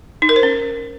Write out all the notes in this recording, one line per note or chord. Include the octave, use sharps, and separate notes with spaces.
D#4
A#4
C5
C#4